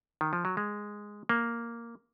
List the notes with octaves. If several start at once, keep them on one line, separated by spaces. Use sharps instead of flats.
D#3
F3
F#3
G#3
A#3